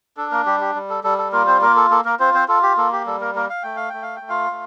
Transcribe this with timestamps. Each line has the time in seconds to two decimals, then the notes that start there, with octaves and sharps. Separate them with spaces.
0.17 D4 A4
0.31 A#3 A#4
0.46 G3 G4
0.61 G4
0.75 G3
0.90 A4
1.04 G3 A4
1.18 A4
1.32 A#3 F4 A#4
1.47 C4 C5
1.61 A#3 A#4
1.76 A4
1.90 A#3 A4
2.05 A#3 A#4
2.20 C4 F4 C5
2.34 C4 C5
2.48 F4 A4
2.63 G4
2.77 A#3 A4
2.92 G4
3.06 G3 A4
3.21 A#3 A#4
3.35 A#3 A#4
3.50 F5
3.63 A3 G5
3.76 F5
3.89 A3 G5
4.02 F5
4.16 G5
4.22 A3
4.29 F4 F5
4.51 A3